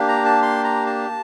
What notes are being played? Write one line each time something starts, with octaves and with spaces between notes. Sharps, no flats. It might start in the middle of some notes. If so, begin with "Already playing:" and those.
Already playing: A#3 D4 G4
A#5
A5
C6
A#5
A5